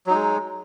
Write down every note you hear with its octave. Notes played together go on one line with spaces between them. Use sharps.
F#3 G#3 D#4